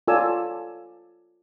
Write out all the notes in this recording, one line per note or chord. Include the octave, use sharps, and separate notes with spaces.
F4 A4 C#5 D5 G#5 E6